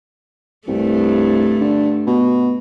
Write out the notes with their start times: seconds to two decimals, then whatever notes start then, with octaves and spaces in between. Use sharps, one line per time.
0.68 C2 G2 A3
1.61 D3
2.06 B2